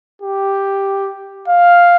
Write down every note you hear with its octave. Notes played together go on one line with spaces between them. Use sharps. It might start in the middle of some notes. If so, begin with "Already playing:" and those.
G4
F5